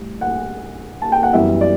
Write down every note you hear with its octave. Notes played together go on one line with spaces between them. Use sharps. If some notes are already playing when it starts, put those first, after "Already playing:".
Already playing: A2 G3
F#5
A5
G5
F#5
F#2 E3 G3 B3 E4 E5
D5